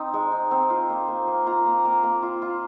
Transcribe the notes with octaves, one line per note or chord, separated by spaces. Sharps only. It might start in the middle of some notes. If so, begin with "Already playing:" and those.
Already playing: C4 D#4
G#3
D#4
C4
F4
A#3
A#3
A#3
F4 A#5
A#3
A#3
A#3
F4
F4